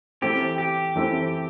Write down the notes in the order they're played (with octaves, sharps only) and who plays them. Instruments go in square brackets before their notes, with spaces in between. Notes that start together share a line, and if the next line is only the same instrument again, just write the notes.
[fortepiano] E3 A3 C4 [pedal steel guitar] G4
[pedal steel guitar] G4
[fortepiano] E3 A3 C4